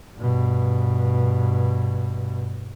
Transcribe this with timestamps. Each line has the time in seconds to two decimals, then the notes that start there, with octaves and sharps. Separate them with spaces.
0.16 G2 B2